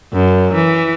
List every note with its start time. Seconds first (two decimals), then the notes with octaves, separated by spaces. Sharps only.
0.13 F#2
0.54 E3